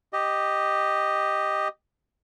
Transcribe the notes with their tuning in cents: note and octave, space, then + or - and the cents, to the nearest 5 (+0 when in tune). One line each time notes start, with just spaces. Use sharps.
G4 +0 D#5 -5